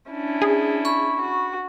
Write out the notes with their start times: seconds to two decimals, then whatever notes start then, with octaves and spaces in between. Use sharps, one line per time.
0.11 C#4 D4 E4
0.42 G#4
0.85 B5 C#6
1.21 F#4